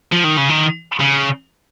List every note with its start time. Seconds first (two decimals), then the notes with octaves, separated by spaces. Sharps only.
0.12 F3
0.24 D#3
0.37 C#3
0.50 D#3
1.00 C#3